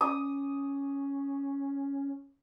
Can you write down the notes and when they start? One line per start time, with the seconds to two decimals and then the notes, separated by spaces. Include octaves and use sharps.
0.01 C#4 D#6